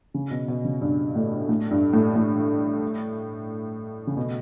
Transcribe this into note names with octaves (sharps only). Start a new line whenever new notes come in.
C#3
B2
B2
C#3
G2
A2
A2
G2
A2
A2
C#3
B2